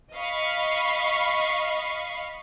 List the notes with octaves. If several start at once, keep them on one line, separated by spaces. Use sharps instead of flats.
D#5 F5 B5 C#6